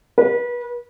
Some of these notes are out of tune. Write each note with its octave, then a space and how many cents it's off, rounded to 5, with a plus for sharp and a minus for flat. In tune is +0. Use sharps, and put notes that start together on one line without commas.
B4 -30